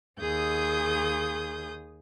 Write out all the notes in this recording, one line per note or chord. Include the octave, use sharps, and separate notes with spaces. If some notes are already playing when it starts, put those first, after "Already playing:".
D#2 G#4 D#6 G6